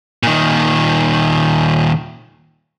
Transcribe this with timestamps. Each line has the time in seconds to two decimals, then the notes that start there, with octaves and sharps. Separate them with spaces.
0.23 A#2 D#3